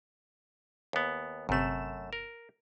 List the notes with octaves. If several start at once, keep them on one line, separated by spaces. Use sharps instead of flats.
D#2 B3
G1 F#2 C3 A3 E7
A#4